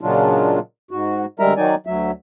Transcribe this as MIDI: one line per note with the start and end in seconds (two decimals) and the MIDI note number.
0.01 0.59 46
0.01 0.59 49
0.01 0.59 54
0.01 0.59 56
0.01 0.59 62
0.01 0.59 65
0.91 1.25 44
0.91 1.25 66
1.40 1.53 38
1.40 1.53 55
1.40 1.53 56
1.40 1.53 70
1.40 1.53 76
1.40 1.53 82
1.57 1.75 51
1.57 1.75 54
1.57 1.75 63
1.57 1.75 74
1.57 1.75 80
1.87 2.11 38
1.87 2.11 54
1.87 2.11 76